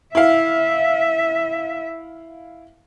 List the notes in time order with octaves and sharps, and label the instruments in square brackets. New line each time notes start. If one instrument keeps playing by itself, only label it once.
[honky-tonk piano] E4 F5 [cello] E5